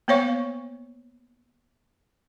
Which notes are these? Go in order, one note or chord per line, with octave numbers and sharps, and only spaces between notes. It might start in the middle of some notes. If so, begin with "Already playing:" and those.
A#3 B3 C5 C#5 F5 C#6